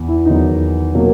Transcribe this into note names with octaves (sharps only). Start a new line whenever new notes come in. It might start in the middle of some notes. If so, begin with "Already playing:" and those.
Already playing: E2
E4
E2 D#3 F#3 B3 D#4
B2 F#3 A#3